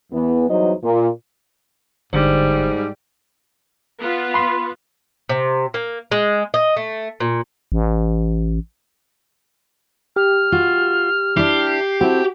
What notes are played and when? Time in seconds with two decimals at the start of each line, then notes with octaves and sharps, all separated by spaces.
0.12 E2 E3 B3
0.49 E2 F#3 G3 D#4 C5 D#5
0.83 A#2
2.13 G1 G#2 D3 G3 C5
4.01 B3 F4 B4
4.34 B5 C6
5.29 C3
5.74 A#3
6.12 G#3
6.54 D#5
6.76 A3
7.20 A#2
7.72 A1
10.16 G4 F6
10.52 F4 F#4
11.37 D4 E4 G4 C7
12.01 C4 E4 F#4 A4